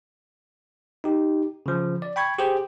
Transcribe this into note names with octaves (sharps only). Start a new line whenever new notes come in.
D#4 G4
C#3 F3
D5
G5 B5 C#6 G#6
G4 G#4 C5 G5